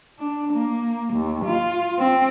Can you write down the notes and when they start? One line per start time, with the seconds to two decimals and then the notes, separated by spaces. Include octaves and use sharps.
0.20 D4
0.53 A#3
1.14 D#2
1.45 F4
1.98 C4